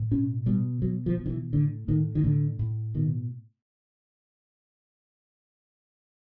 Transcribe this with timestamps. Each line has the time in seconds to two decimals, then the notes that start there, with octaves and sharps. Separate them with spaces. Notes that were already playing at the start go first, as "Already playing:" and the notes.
Already playing: A2
0.11 B2 C#4
0.46 B2 G3
0.82 B2 F#3
1.06 F3
1.17 B2
1.26 D#3
1.29 E3
1.53 A2 D3
1.88 A2 D#3
2.15 D#3
2.24 A2 D3
2.59 A2
2.94 B2 D#3